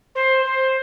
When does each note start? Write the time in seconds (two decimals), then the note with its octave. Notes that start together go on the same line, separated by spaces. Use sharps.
0.15 C5
0.45 C5